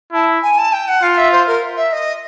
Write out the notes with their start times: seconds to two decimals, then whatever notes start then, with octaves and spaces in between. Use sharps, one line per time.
0.13 E4 A5
0.43 G#5
0.58 A5
0.73 G5
0.88 F#5
1.03 F4 F5
1.18 E5
1.32 C5
1.47 A#4
1.77 E5
1.92 D#5